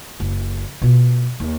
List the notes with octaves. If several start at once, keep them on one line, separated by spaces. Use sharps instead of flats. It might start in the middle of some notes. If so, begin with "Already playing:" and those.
F#1
B2 F4
D#2